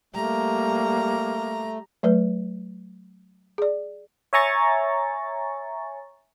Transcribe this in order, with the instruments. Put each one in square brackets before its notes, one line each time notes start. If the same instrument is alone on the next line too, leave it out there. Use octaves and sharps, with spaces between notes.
[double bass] G3 [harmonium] A3 [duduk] A#3 [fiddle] A#5
[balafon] F#3 A3 B4
G#4 D5
[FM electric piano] C#5 E5 G#5 A#5 C#6 A6